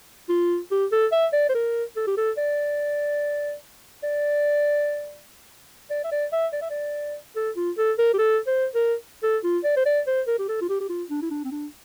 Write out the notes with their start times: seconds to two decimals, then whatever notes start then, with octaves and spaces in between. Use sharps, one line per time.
0.29 F4
0.71 G4
0.92 A4
1.12 E5
1.33 D5
1.49 C5
1.55 A#4
1.96 A4
2.07 G4
2.17 A4
2.37 D5
4.03 D5
5.90 D5
6.04 E5
6.12 D5
6.32 E5
6.53 D5
6.61 E5
6.70 D5
7.36 A4
7.56 F4
7.78 A4
7.98 A#4
8.14 G4
8.19 A4
8.47 C5
8.75 A#4
9.23 A4
9.44 F4
9.64 D5
9.77 C5
9.86 D5
10.07 C5
10.27 A#4
10.39 G4
10.48 A4
10.61 F4
10.69 G4
10.81 G4
10.89 F4
11.10 D4
11.22 E4
11.31 D4
11.44 C4
11.52 D4